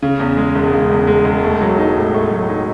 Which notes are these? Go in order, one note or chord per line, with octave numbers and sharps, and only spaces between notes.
C#3
E2
G#3
E1
C#3
E2
G#3
E1
A3
F#3
D#4
A2
A3
F#3
D#4